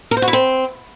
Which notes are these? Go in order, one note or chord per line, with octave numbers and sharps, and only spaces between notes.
A#4
C5
F#4
E4
C4